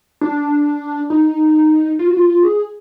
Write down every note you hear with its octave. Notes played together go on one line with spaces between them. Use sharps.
D4
D#4
F4
F#4
F4
G#4